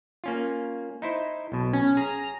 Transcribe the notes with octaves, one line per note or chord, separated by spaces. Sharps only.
A#3 C#4 F4
D#4 E4 C5
B1 B2
C#4
G#4 A#5